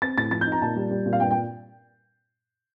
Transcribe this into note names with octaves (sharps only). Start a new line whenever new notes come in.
C4 A6
A2 A6
F3 A6
G6
D#4
A#5
A#2 A5
G3
G3
A#2
F5
G2 G5
G5